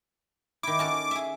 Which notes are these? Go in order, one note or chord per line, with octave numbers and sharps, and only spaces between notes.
D#3 E4 D6
C#4 F#4 A4
G#4 E5